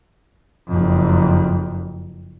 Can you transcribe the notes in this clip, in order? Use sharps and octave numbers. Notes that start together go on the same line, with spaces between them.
F#1 F2